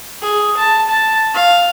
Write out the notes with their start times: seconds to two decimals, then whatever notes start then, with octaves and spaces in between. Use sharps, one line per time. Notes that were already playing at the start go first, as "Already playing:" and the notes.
0.22 G#4
0.57 A5
0.88 A5
1.34 F5